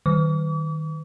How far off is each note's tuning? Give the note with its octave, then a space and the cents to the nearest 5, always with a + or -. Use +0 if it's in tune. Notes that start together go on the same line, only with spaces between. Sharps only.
D#3 +0 D6 -45